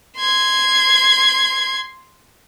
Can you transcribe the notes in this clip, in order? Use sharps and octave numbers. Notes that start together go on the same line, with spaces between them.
C6 G#6